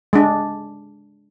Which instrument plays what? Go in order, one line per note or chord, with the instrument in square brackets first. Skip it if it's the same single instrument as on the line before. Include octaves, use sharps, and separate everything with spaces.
[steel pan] G#3 D4